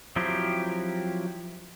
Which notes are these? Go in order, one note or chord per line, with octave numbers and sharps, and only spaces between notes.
F3 F#3 C4 E4 G4